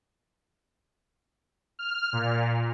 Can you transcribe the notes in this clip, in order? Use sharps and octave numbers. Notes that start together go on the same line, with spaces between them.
F6
A#2